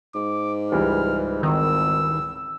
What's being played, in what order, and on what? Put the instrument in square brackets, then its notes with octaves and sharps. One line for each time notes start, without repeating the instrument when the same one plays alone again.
[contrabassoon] G#2 [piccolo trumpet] D6
[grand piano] C#2 E3 G3 [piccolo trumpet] F6
[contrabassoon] G#1 [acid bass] D#3 [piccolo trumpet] E6